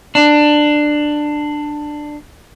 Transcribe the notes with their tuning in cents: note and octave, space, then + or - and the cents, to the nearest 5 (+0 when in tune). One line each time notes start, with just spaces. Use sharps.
D4 +15